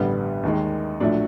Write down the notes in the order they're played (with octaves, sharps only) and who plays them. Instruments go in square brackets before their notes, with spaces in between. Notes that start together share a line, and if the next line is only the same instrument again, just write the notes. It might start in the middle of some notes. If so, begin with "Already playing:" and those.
Already playing: [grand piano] A1 G2 D3 G3 B3
D#2 D#3 G#3
A#1 A2 F#3 A3 D4